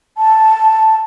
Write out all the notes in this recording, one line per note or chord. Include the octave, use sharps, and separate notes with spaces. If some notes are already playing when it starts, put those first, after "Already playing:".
A5